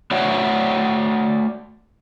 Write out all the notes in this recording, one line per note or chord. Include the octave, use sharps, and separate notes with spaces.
A3 F#4 C#5 D5 E5 F#5